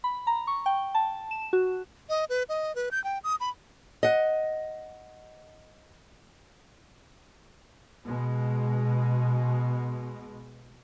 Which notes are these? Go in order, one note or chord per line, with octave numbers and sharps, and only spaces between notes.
B5
A#5
C#6
G5
A5
E7
F#4
D#5
B4
D#5
B4
G6
G5
D#6
B5
D#5 F#5
B2 G#3